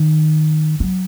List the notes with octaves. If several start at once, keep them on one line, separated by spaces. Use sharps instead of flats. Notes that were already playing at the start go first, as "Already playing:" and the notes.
Already playing: D#3
F#3